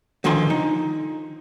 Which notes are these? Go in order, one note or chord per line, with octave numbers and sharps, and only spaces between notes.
D3 D#3 F3 G#5 C6
D#4